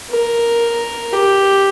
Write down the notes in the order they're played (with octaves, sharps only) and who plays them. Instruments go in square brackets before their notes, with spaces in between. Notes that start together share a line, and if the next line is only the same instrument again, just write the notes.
[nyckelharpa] A#4
G4